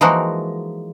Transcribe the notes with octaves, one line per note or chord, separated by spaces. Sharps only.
E3 F3 G#3 A#3 D#4 F#4